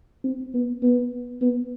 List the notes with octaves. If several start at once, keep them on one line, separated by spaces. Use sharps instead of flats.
C4
B3
B3
B3